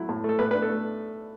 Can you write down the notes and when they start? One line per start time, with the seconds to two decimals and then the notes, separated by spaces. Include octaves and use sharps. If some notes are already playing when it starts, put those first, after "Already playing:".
Already playing: F#3 A3 E4
0.09 A2
0.24 A3 A4
0.39 A2 B4
0.51 B4
0.54 D4
0.62 A4
0.69 A3